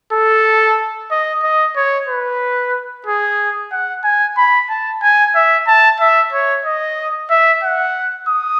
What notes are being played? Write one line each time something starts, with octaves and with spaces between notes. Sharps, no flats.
A4
D#5
D#5
C#5
B4
G#4
F#5
G#5
B5
A5
G#5
E5
A5
E5
C#5
D#5
E5
F#5
D#6